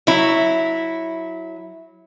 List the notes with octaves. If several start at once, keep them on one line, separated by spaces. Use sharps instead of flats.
F#3 E4